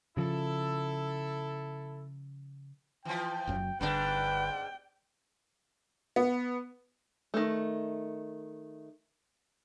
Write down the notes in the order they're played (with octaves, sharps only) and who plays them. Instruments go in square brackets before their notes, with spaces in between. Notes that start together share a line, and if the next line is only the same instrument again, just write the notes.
[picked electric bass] C#3 F3 [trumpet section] E4 A4
[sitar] E3 F3 [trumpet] G5
[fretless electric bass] F#1 F#2 F#3
[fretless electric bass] G1 D3 [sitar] G#2 D4 [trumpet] B4 [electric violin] G5
[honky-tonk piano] B3
[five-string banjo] D#3 A3